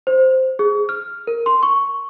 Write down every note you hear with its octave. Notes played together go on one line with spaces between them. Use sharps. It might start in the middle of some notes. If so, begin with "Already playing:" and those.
C5
G#4
F6
A#4
C6
C#6